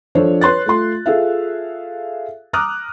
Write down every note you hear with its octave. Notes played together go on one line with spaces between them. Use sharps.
F3 D4 F4 A4 C5 C#5
B4 C#5 C6 F#6 A6
A3 F4 C6
F4 G#4 A4 E5 F5
A#5 D6 D#6 F6 F#6